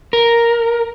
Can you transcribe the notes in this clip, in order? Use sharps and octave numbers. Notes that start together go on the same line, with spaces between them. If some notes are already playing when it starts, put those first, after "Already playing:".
A#4